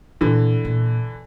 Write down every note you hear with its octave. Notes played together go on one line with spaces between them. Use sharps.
A#2 D3 E3
A#2